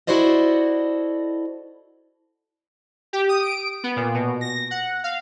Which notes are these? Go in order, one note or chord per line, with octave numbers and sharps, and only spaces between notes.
E4 F#4 A4 C5 D5 D#5
G4
D#6
D7
B3
A#2
B2
A#6
F#5
F5